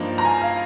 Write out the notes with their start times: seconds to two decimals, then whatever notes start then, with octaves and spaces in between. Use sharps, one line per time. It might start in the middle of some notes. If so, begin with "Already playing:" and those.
Already playing: G2 F3 A#3 D#4 F5
0.18 A#5
0.25 G#5
0.42 F5